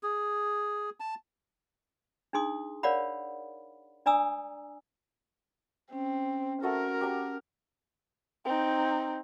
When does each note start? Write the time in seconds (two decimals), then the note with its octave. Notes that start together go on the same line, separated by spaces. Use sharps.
0.03 G#4
1.00 A5
2.33 D4 D#4 G#4 C6 D#6
2.83 A#4 C#5 D5 F5 F#5 B5
4.06 D4 D5 G#5 A#5 D#6 E6
5.93 C4 C#4
6.62 A3 F#4 A4 A#4
7.01 G4 A#5
8.45 C4 D#4